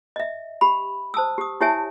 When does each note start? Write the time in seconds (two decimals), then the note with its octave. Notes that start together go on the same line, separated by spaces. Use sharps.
0.16 D#5 E5
0.61 G4 B5
1.14 C5 A5 D#6 E6
1.38 G4 D#6
1.61 E4 G4 C#5 E5 G#5 A5